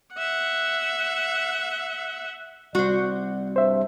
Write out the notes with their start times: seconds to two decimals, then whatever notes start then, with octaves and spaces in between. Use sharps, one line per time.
0.14 E5 F#5
2.75 G3 B3 C4 F#4 C5 D5
3.56 G2 C5 E5